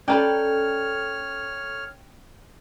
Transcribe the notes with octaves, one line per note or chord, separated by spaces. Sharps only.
C#4 A4 B4 C#5 D5 G5 A#5 F6